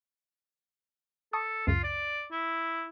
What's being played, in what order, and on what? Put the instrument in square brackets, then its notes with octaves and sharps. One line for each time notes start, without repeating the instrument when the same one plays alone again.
[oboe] A4 [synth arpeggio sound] A5 C#6 D#6
[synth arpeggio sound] C#2 F#2 C#3 [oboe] F4
[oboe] D5
E4